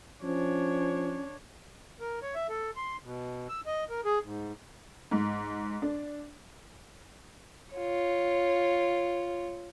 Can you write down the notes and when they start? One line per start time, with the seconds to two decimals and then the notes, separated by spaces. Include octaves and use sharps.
0.23 F3 C#4 D4 C#5
2.00 A#4
2.22 C#5
2.35 E5
2.49 A4
2.76 C6
3.04 B2
3.49 E6
3.66 D#5
3.90 A#4
4.05 G#4
4.24 G#2
5.11 G#2
5.82 D4
7.75 F4 C#5